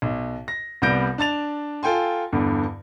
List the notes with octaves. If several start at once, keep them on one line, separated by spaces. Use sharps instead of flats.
B1
A#6
C2 G3 B3 G6 A#6 D7
D4 A5 A6 F7
F4 A4 G5 G#5 C6
E2 G2 D3